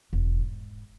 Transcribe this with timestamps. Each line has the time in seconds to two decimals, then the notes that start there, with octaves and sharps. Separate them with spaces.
0.13 E1
0.39 G#2